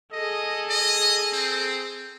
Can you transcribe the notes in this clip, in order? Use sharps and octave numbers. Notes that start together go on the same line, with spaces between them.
G#4 A4 D#5
D#5
C4